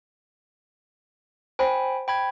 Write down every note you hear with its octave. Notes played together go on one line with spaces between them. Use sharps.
C5 G5 G#5 B5
G5 B5 G#6